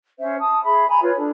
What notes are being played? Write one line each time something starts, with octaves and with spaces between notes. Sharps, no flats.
C#4 C5 E5
A5 D#6
G#4 E5 B5
G#5 A#5 B5
F4 B4 C#5
D4 A4